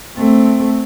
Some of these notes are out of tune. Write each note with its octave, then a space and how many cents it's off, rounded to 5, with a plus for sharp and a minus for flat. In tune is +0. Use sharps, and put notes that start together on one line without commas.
A3 +5 C4 +0